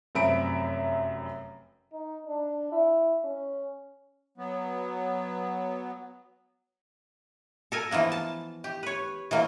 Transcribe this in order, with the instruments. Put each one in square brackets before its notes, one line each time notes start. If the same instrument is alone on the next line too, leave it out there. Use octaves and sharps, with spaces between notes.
[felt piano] F1 F#2 C4 E5 B5 D7
[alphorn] D#4
D4
E4
C#4
[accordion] F#3 B3
[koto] A4 A#4 G#5
E3 F3 A#3 B3
A5
G4
B4 C#5
E3 F#3 A#3